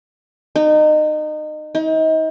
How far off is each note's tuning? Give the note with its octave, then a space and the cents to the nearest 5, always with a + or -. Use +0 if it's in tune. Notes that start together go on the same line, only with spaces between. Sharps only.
D#4 -25
D#4 +35